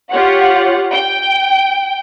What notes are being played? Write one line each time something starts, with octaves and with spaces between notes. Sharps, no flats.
F4 G4 C#5 F#5
G5